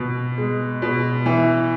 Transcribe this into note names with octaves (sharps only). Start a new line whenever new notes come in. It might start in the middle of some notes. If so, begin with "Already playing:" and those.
Already playing: B2
G#3
B2
E3